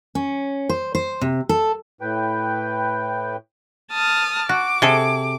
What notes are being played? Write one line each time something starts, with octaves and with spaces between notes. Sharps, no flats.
C#4
C5
C5
C3
A4
A2 B4 G5
A5 D#6 F6
F#4 D6
C3 G#4 A4